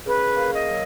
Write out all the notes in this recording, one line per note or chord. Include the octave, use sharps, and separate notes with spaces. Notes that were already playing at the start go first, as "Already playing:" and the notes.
C#3 B4
A#3
D#5
F#3